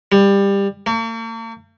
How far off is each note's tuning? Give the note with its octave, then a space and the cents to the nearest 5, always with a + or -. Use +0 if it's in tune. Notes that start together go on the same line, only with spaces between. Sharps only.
G3 +20
A#3 -45